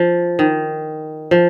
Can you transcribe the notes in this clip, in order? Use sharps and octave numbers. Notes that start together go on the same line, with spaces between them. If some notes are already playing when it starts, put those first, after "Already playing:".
Already playing: F3
D#3
F3